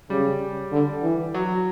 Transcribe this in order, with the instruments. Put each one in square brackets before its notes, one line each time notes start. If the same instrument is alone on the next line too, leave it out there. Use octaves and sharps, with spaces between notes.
[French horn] C#3 [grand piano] G3
[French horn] D3
E3
[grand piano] F#3